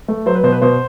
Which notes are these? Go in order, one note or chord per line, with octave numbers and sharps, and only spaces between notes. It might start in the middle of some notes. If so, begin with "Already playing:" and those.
A3
F#3 C5
B4
B2 C5
B4
B2 C5